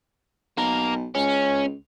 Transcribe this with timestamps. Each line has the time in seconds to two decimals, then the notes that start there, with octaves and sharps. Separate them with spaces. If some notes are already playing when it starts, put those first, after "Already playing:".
0.57 B1 A#3 A#4
1.15 C#2 C#4